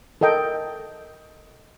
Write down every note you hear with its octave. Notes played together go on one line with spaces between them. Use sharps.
A4 A#4 D#5 G5